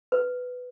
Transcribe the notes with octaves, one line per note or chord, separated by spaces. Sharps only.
B4